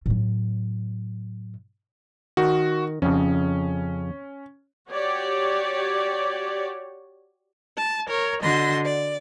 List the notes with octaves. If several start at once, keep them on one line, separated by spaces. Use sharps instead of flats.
A2 F#3
D#3 F#4
F2 C#3 C#4
F#4 G4 C#5 D5
A5
A#4 C#5
D3 F#4 D#5 C6 A#6
D5